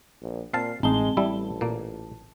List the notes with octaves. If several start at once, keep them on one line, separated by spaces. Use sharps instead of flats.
A#1
A#2 C4 F5 A5 C7
A1 G#3 C4 D#4 A5 G7
A1 G3 E4 A5
A#2 A#3